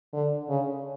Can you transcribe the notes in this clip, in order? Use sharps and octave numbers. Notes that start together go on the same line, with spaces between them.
D3
C#3